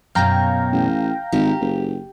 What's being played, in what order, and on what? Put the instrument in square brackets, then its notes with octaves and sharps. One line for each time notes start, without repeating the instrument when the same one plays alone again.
[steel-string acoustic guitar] F#2 B2 C#5 [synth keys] F5 G5 A#5
[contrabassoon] A1
[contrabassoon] G#1 [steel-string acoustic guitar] G4
[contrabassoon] F#1